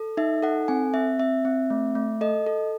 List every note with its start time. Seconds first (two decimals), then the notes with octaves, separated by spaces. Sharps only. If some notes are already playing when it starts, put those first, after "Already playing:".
Already playing: A4
0.17 D#4 E5
0.43 A4 F#5
0.68 C4 G#5
0.94 C4 E5
1.19 C4 E5
1.45 C4
1.70 A3
1.95 A3
2.21 A4 D#5
2.46 A4